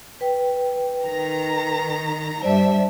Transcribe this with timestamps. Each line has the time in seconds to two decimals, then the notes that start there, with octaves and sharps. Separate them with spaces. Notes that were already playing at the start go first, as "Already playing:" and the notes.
0.21 B4 G5
1.03 D#3 A#5
2.42 G2 G3 C5 D5 E5 A5